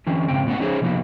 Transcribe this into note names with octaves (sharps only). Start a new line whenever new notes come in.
D3 E3 C4 C#4
G#2 C#3 C4 G5
A2 B3 C#4 F#5
C#4 D#4 G#4 C5 C#5
C3 F3 A#3 B3 D#4 F#4